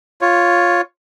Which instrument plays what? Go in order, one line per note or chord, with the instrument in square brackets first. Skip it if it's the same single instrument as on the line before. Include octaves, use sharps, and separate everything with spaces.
[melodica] F4 C#5